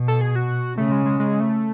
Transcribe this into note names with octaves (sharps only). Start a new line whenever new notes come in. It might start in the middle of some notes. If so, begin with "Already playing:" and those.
Already playing: B2
A4
G#4
F#4
C#3 A3
G#3
G#3
G#3
A3